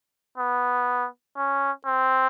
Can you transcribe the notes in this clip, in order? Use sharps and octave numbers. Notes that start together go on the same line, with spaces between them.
B3
C#4
C4